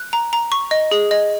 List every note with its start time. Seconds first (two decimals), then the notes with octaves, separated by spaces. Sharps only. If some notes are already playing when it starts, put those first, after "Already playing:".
Already playing: F#6
0.13 A#5
0.33 A#5
0.52 C#6
0.71 D#5
0.91 G#4
1.11 D#5